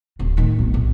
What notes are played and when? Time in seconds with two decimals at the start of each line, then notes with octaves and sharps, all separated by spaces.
0.19 D1 C#3
0.37 A2 D#3
0.59 B1
0.74 A1